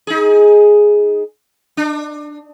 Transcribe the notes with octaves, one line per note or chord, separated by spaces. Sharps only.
D#4 G#4
D4